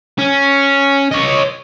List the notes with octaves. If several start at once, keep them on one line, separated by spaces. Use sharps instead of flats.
C#4
C#5 D#5